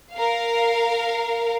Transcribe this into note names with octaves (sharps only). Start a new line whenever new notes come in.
A#4 F5